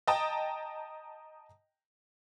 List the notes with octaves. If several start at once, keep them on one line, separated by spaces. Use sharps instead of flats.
D#5 G5 A5 A#5 D#6